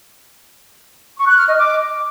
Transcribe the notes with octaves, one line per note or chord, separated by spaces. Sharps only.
C#6
F#6
F6
D#5
D6